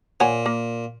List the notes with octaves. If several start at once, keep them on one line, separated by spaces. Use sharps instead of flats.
A#2 C#5 F#5 G#5
A#3